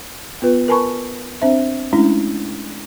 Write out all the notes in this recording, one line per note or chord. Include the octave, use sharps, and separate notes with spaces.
B3 F4 B4
A#4 B4 G#5 A5 B5 C#6
C4 D4 C5 E5
G#3 A3 C#4 D4 E4